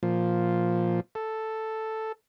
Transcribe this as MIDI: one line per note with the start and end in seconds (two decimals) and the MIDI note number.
0.03 1.00 46
0.03 1.00 53
1.15 2.12 69